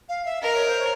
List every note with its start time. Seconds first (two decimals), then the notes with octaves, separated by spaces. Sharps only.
0.09 F5
0.25 E5
0.42 A#4 D#5
0.55 C#5
0.67 C5
0.80 C#5